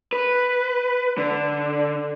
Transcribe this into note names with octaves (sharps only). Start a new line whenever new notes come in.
B4
D3